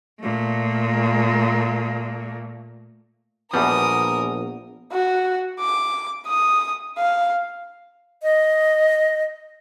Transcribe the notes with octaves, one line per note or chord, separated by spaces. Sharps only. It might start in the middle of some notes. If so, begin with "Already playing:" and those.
A#2 A3
A#1 E2 B2 G3 B3 A#4 D#6
F#4
D6
D#6
F5
D#5